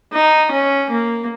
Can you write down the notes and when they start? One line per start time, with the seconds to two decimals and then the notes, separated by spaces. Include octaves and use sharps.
0.12 D#4
0.51 C#4
0.91 A#3